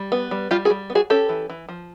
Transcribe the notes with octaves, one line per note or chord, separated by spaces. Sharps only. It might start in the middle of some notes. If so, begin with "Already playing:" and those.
Already playing: G3
B3
G3
G3 F4 G4
F#4 G#4
G3
B3
F#4 G#4
C#4 G4 A4
E3
E3
F3